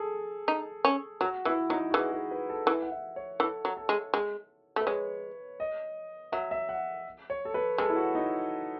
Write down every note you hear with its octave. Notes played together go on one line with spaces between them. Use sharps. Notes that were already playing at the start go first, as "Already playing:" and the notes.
Already playing: G#4 A4
D#4
C#4
F#3 F#4
E3 E4
F#3 D#4
F#4
E3 G#4
G#4
B4
A4
E3
F#5
E5
C#5
E3 A4
F#3
A4
G#3
G#3
A3 B4
G#3 C#5
D#5
F#3 E5
E5
F#5
C#5
A4
B4
G#3 A4
E4
F#4
D#4